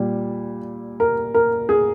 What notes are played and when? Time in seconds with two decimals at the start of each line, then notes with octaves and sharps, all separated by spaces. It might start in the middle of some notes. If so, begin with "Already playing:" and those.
Already playing: A#2 G3
1.00 A#4
1.34 A#4
1.69 G#4